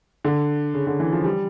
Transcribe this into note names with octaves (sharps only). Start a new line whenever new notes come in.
D3
C#3
D3
E3
F3
G3